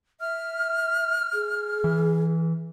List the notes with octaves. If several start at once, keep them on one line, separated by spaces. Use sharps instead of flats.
E5 F6
G#4
E3